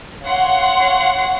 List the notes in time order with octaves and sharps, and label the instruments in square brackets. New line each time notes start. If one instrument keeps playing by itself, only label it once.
[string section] C#5 F5 F#5 C6